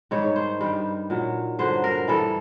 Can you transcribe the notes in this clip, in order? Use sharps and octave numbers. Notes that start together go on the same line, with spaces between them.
G#2 D#3 G3 C#5
C5
G2 D#3 G3
A#2 F#3
G2 D3 F#3 C5
A#4
G2 E3 G3 A4